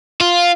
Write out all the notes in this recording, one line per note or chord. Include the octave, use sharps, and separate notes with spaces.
F4